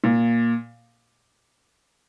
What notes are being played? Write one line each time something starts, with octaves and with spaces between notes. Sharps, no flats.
A#2